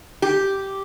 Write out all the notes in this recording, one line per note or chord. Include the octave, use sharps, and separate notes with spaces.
G4